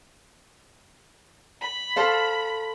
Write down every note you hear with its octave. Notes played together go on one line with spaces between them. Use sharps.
B5
A4 C5 F5